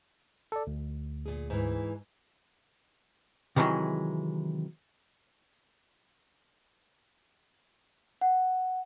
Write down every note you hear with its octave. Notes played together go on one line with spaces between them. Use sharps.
A4 D5
D2
A#2 G#4
G#2 E3
C3 D#3 E3 F#3 G#3
F#5